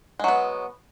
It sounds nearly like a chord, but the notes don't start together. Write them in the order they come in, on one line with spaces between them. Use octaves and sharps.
G#3 F#3 B3